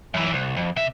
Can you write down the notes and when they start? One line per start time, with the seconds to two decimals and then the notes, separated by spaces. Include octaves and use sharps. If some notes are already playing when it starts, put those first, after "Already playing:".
0.14 F#2 E3
0.33 C2
0.56 F2
0.76 C3 E5